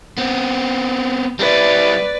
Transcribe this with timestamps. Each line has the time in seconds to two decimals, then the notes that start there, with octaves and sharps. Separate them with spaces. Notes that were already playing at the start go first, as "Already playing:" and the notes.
0.18 B3 C4
1.39 G3 E4 B4 D5